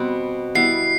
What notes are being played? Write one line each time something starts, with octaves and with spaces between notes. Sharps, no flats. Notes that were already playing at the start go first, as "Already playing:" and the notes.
Already playing: B2 G3 C4
G3 B3 E4 C7